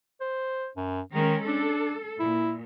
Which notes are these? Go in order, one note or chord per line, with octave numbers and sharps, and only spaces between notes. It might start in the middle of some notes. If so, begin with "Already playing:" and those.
C5
F#2
D#3 G#3 C#4 A#4
D4 A4
A#2 E4